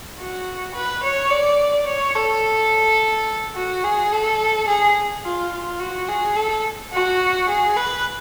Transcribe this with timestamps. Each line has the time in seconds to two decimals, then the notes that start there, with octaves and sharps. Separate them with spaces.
0.19 F#4
0.75 B4
1.03 C#5
1.31 D5
1.87 C#5
2.15 A4
3.55 F#4
3.84 G#4
4.12 A4
4.68 G#4
5.24 F4
5.53 F4
5.80 F#4
6.09 G#4
6.36 A4
6.93 F#4
7.49 G#4
7.77 B4